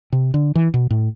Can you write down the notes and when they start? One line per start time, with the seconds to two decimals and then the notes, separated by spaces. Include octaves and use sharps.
0.13 C3
0.34 D3
0.55 E3
0.74 B2
0.91 A2